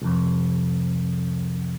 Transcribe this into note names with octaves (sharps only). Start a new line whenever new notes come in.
C2 F2